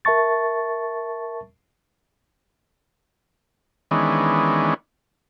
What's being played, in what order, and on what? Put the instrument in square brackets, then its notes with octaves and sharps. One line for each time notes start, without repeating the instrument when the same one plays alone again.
[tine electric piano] A#4 E5 A5 C#6 A6
[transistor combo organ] D#3 E3 G#3 B3 C#4 D4